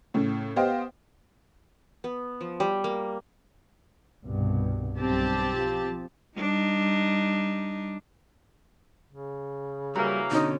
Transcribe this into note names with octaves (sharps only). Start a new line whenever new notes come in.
A2 C#3
B3 G4 C5 D#5 F5 G5
B3
F3
G3
A#3
C2 G2 B2
B1 G2 C4 G4 A5
F3
G3 D4 D#4
C#3
E3 F#3 G3 A#3 A#5
B2 D3 C#4 D#4